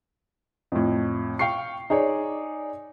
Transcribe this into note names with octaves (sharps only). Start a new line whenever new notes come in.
F2 A2
F5 G5 C#6 C7
D#4 G#4 C#5 D5